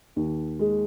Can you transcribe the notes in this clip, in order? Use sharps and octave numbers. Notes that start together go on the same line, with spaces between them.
D#2
G#3